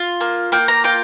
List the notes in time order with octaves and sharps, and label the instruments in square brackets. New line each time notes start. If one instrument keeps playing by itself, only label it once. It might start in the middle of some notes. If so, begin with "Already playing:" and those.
Already playing: [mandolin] F4
A#3
A#3 G5
A#5
F4 G5